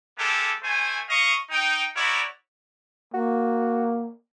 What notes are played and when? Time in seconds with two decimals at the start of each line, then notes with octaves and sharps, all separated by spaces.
0.18 G#3 A#3 G4 A4
0.63 A3 C5 G#5
1.09 D#5 F5 C#6
1.50 D#4 G5
1.95 E4 F#4 A#4 C#5 D5
3.14 A#3 F#4